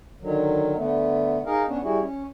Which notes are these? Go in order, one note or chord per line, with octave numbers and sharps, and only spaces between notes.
D3 D#3 F#3
D3 A3 B3
D#4 G#4 A#4 D#5 F5
B3 C#4 D4
G3 E4 F#4 G#4
C#4